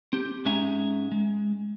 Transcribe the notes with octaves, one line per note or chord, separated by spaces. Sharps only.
C4 G4
G#2 G#3 C#4 E5 G#5 A#5
G#3